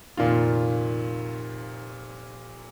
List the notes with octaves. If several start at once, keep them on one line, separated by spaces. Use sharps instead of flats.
F1 A#2 D#3 F4